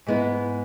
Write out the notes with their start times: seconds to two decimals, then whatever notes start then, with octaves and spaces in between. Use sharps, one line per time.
0.06 G#2 G#3 B3 E4